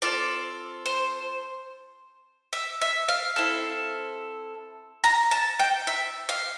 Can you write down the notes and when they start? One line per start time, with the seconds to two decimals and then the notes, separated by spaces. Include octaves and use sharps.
0.02 C4 F4 A4 D5
0.86 C5
2.53 E5
2.81 E5
3.08 F5
3.36 C4 E4 A4
5.04 A#5
5.31 A5
5.59 G5
5.87 E5
6.29 F5